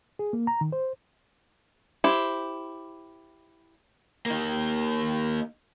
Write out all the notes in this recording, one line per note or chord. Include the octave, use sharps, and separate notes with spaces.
G#4
A#3
A#5
D#3
C5
E4 G4 C5
A#3 D#4